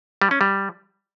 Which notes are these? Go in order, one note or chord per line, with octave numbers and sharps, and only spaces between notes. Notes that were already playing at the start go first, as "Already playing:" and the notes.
G3
C#4
G3